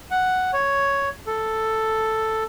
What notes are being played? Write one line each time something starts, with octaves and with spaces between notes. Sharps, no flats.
F#5
C#5
A4